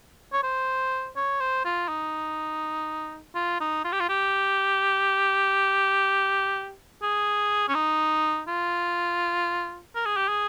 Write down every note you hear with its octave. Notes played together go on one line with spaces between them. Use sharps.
C#5
C5
C#5
C5
F4
D#4
F4
D#4
F4
G4
F4
G4
G#4
C#4
D#4
F4
A#4
G#4
G4
G#4